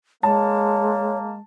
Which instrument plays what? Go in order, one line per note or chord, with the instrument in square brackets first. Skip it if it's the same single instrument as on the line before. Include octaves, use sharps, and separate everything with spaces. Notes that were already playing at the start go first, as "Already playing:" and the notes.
[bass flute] G#3 [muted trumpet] A#3 [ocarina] C#5 [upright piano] A5